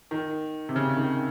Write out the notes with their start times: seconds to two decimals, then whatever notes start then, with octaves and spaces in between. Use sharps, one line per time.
0.11 D#3
0.69 C3
0.76 C#3
0.97 D#3